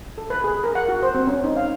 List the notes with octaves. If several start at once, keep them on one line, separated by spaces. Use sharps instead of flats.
A4
B4
G#4
A#4
F#5
F#4
C5
C4
C#4
D#4
F5